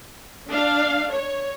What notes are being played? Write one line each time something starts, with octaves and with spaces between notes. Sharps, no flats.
D4 F5
C#5